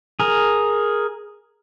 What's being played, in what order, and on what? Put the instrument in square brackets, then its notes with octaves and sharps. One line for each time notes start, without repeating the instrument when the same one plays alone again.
[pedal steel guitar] G#4 A#4